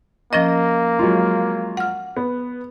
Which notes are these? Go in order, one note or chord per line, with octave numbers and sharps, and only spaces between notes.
F3 A#3 C#4 D#5 A#6
F#3 G#3 F4
F#5 F6
B3